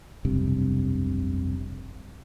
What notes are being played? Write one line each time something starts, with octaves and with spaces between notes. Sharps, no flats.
F1 B1 G2 C3